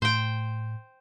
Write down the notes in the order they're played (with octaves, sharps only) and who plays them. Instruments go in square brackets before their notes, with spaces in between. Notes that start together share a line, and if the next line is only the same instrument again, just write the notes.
[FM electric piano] A2 [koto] C5 G5